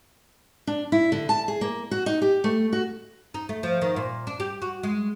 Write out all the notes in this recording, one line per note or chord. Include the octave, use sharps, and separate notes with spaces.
D4
E4
D3
A5
G#4
A#3
F#4
D#4
G4
A3
F#4
D#4
A3
F3
D#3
A#2
D4
G4
F#4
G#3